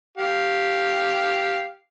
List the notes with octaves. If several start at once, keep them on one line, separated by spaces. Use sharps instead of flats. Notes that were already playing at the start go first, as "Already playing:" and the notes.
G4 F5